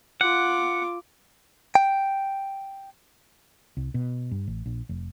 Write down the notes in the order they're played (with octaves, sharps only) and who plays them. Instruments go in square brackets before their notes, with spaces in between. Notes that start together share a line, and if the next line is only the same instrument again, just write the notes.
[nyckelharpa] F4 D6 [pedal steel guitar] F#5
[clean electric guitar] G5
[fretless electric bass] C2
B2
G2
A1
A#1
F1